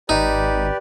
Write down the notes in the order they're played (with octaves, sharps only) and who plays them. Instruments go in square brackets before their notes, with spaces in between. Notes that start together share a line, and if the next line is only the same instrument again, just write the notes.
[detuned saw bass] G#1 [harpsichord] D#4 [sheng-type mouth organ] G4 B4 D5